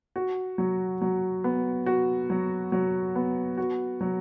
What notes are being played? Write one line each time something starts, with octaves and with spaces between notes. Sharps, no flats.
F#4
F#3
F#3
B3
F#4
F#3
F#3
B3
F#4
F#3